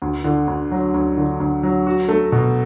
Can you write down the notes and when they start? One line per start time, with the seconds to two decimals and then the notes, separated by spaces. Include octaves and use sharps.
0.02 D2
0.24 D3
0.48 D2
0.71 F#3
0.94 D2
1.17 D3
1.40 D2
1.63 F#3
1.87 F#4
2.09 A3
2.32 B2